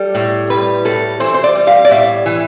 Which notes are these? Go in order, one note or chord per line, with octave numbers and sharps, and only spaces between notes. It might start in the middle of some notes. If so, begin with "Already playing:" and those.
Already playing: G3 A4
A2
G3 B4
A2 A4
E3 C5
C5
D5
G3
F5
D5
A2 E5
E3